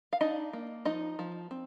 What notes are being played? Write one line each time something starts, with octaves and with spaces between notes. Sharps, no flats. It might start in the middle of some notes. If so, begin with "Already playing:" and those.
F5
D4 D#4 D#5
A#3
F3 D#4 D#5
F3
C4